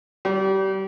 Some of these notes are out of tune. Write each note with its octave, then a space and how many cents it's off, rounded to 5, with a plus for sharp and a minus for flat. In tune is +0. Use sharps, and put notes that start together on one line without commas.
G3 -30